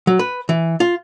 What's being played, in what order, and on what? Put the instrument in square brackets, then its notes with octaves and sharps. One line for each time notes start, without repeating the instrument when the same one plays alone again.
[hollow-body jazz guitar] F#3
B4
E3
F4